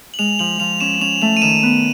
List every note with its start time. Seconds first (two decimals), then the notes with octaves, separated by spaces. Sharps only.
0.14 F#7
0.19 G#3 F7
0.39 F3 F#7
0.60 F3 F7
0.81 C#4 E7
1.01 C#4 F7
1.22 A3 F7
1.37 D#7
1.42 D#3 E7
1.63 B3